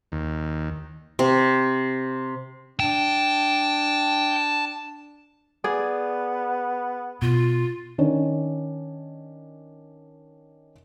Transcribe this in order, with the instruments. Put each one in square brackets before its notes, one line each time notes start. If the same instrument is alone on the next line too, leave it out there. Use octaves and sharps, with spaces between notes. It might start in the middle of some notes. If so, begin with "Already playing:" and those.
[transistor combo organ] D#2
[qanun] C3
[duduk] D4 [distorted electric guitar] G5 [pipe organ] A5
[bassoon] B3 [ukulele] G#4 D5
[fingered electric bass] B2 [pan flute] F4
[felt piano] D#3 C#4 D4